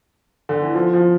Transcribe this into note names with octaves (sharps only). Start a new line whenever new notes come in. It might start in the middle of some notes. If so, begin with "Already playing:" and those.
D3
E3
F3
F3